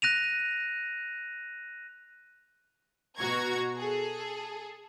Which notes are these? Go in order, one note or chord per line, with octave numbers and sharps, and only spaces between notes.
F#6 A#6 D#7 F7
B2 F#4 A#5 C#6 G#6
G#4 A4